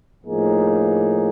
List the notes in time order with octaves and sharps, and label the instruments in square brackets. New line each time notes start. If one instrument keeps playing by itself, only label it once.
[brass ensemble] A2 F3 A#3 D#4 G#4